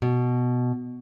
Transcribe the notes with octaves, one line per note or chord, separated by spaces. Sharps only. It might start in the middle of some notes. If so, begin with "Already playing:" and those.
B2